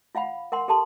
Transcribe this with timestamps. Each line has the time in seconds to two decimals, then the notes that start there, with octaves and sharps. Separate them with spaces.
0.15 F4 F5 F#5 B5
0.52 A#4 F#5 C6
0.68 G4 A4 A5 C6